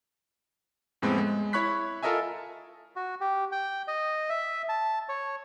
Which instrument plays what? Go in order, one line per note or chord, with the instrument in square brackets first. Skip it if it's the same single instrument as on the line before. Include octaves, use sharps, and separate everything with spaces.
[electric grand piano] F2 A2 G#3 B3 C4
G#3
E4 C#5 B5 C#6 F#6 B6
F4 A4 A#4 D#5 E5 G#5
[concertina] F#4
G4
G5
D#5
E5
A5
C#5